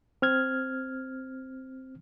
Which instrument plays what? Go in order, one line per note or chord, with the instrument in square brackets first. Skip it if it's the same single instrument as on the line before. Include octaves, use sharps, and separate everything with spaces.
[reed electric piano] C4 F6 G#6